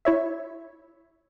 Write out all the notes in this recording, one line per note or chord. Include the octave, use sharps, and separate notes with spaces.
E4 C#5 E5